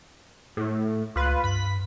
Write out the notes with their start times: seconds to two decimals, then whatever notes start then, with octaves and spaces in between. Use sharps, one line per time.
0.57 A2
1.16 C#2 F4 B4
1.44 G2 B5 B6